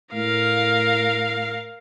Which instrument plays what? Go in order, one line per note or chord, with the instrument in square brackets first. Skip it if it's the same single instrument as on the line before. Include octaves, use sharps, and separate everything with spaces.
[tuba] A2 [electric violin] A#4 F5